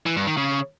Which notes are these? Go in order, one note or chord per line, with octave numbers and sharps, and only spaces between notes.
E3
G2
D#3
C#3